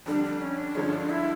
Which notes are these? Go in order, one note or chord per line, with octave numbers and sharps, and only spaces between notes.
F2 D3 G3 D4
D4
C#4
D4
G2 D3 F3 G#3 C#4
D4
E4